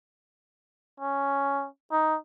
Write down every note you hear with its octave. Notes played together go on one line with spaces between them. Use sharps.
C#4
D#4